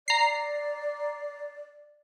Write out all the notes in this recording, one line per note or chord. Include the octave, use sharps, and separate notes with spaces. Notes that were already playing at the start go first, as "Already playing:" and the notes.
D5 A#5 C7